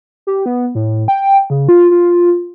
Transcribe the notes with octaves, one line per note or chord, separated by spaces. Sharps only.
G4
B3
A2
G5
C#3
F4
F4